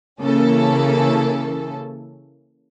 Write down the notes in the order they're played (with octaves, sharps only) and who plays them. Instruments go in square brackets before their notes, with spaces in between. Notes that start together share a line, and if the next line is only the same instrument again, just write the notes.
[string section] C#3 E3 A#3 C#4 A4